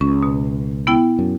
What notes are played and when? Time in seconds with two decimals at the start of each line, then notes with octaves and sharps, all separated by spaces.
0.01 C#2 C#4
0.23 B2
0.87 B3 E4 G5
1.19 F#2